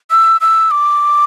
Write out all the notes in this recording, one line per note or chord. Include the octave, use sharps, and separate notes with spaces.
E6
E6
D6